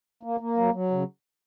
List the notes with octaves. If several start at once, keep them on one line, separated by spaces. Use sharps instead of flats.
A#3
A#3
F#3
F#3
C#3